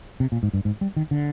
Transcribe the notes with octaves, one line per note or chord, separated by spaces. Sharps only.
C3
A#2
G#2
G2
G#2
G3
D#3
D3